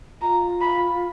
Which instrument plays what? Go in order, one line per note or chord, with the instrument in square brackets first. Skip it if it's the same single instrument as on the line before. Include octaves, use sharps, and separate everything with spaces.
[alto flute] F4 [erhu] A#5
[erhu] B5